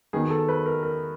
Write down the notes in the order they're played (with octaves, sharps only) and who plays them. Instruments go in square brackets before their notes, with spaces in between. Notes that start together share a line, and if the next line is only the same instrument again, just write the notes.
[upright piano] D#3 F#3 B3 [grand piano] G#4
[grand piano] A4
B4
A#4
A#4